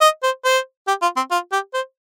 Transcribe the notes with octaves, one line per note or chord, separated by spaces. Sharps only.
D#5
C5
C5
G4
F4
C4
F4
G4
C5